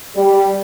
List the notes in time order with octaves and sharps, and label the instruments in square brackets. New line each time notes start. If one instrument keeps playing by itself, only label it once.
[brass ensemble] G3